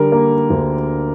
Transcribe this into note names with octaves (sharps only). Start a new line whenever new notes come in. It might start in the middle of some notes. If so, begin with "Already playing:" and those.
Already playing: D3 G3 A#4
A#3
D2